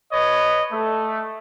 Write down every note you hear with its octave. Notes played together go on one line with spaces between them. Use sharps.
B4 C#5 D#5
A3